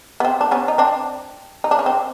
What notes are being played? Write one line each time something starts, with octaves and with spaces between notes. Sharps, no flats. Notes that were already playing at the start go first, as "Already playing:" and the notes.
B3
C4
D4
B3 C#4
D#4
C4 D4
D#4
D4
C#4
C4